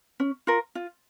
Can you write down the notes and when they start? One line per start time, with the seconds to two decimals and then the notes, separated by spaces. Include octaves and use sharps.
0.20 C#4
0.47 F4 A#4
0.75 F4